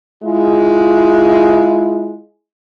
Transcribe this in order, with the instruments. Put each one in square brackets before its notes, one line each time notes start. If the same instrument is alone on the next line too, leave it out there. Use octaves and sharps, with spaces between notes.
[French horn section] G#3 E4 F4